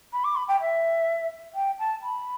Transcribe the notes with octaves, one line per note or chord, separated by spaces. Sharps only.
B5
D6
B5
G5
E5
G5
A5
B5